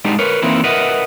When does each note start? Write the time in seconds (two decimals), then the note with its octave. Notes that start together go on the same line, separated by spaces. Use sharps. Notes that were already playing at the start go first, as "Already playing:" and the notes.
0.05 G3 G#3 B3 D4 D#4
0.19 A#4 B4 C#5
0.42 E3 A#3 C4 D#4 E4 B4
0.64 A#4 B4 D#5 E5 F#5